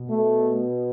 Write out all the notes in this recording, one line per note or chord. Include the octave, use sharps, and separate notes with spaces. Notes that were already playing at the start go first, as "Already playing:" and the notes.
Already playing: B2
A3